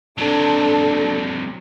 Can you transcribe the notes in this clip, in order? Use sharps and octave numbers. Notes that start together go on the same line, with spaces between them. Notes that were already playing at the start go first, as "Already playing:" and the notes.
C3 F#3 D4 A4